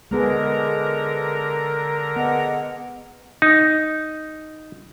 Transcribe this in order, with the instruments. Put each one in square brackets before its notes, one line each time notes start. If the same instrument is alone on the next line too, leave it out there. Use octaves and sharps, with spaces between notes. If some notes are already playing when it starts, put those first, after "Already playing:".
[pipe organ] D3 A#4 A#5 [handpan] G#3 B3 G#4
[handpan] B3 [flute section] G#4 D#5 F#5
[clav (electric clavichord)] D#4